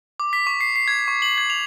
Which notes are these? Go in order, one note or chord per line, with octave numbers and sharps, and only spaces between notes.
D6
B6
C#6
C7
C7
G#6
C#6
F#7
G#6
F7